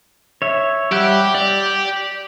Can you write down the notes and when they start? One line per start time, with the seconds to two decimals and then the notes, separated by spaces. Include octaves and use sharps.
0.42 C#5 E5
0.92 G3 G4 E5 F#5
1.35 D5